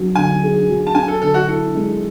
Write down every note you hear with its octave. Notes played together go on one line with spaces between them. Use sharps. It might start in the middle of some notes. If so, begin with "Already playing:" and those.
Already playing: F#3 C#4
D3 G#5
G#4
F#3
A5
C#4 G#5
A4
D3 A4
F#4
E4 A4
G#3